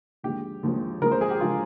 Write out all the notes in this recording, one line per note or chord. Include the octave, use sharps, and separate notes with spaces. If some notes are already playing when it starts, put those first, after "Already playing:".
D#2 D3 F3 G#3 G4
D#2 D3 F3 G#3
D#2 D3 F3 G#3 A#4
C5
G#4
G4
D3 F3 G#3 F4